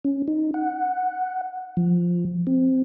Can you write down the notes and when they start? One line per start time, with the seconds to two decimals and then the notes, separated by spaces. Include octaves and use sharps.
0.05 C#4
0.28 D#4
0.54 F#5
1.77 F3
2.47 C4